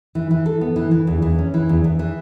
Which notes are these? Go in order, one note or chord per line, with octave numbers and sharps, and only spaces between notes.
E3
E3
A4
B3
E3
E3
E2
E2
C#4
E3
E2
E2
E3